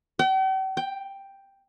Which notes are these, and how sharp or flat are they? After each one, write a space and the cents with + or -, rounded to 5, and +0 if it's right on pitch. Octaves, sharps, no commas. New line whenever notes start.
G5 -45
G5 +5